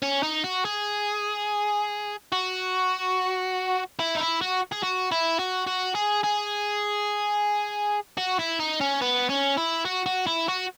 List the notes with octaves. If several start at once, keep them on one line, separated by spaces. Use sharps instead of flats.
C#4
D#4
F#4
G#4
F#4
E4
D#4
E4
F#4
G#4
F#4
E4
F#4
F#4
G#4
G#4
F#4
E4
D#4
C#4
B3
C#4
E4
F#4
F#4
E4
F#4